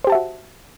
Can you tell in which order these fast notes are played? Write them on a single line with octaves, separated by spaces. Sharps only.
C5 G4 A5 E5 F#4